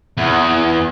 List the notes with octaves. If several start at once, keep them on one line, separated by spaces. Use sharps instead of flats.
E2